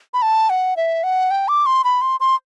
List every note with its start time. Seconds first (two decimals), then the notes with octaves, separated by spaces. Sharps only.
0.14 B5
0.22 A5
0.50 F#5
0.77 E5
1.04 F#5
1.31 G5
1.48 D6
1.66 C6
1.84 B5
2.02 C6
2.20 C6